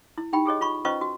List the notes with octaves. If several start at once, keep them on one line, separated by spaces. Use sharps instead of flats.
E4
D#4 G4 G5 B5
G4 G#4 C#5 D#5
F4 B5 C#6
C#4 F4 B4 C5 D#5 C#6
F#4